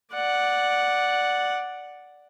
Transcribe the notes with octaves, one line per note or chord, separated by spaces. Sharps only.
D5 F#5